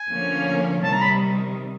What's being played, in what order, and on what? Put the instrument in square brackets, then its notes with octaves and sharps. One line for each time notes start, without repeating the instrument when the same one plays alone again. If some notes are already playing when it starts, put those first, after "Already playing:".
Already playing: [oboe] G#5
[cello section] D3 F3 A#3 C#4
[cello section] C3 D#3 G3 [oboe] A5
[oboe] A#5
B5